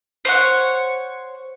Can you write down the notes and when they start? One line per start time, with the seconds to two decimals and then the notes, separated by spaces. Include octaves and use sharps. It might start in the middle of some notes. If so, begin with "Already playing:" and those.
0.25 C5 C#5 F#5